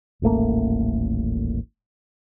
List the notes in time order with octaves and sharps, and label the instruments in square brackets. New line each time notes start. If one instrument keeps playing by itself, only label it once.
[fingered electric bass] D#1 A1 A3 A#3